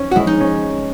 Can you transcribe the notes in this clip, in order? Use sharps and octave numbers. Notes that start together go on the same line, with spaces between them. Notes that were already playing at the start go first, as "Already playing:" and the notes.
Already playing: C#4
F#4
G#3 E4
D#4
C#4